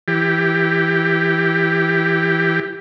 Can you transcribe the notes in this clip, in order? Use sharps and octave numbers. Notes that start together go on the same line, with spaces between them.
E3 G4